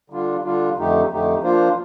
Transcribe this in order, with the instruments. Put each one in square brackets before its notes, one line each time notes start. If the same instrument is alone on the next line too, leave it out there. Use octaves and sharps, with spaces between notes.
[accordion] D3 G3 D4 F4
D3 G3 D4 F4
F2 D3 A3 D#4 G4
F2 D3 A3 D#4 G4
F3 A#3 D4 F4 C5